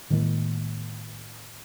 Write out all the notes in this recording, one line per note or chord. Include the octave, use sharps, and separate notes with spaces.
A2 D#3 G#3 A#3